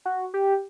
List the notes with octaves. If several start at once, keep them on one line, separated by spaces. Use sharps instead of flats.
F#4
G4